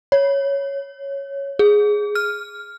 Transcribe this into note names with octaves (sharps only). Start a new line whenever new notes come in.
C#5
G#4
F6